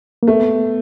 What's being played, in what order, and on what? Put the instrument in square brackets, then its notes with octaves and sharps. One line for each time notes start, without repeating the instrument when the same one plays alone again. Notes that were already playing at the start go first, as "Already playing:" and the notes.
[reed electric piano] A#3
[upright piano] A3 [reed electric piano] B3